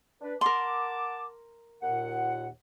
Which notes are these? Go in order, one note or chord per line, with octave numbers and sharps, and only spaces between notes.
D4 B4
A#4 F#5 A5 C6 D6
D#2 A#2 F#5